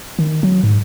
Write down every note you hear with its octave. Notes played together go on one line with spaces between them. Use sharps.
D#3
F#3
G#2